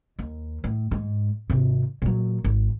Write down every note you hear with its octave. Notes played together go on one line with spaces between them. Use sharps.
D#2
A2
G#2
G#1 C3
A#2 F#3
G#1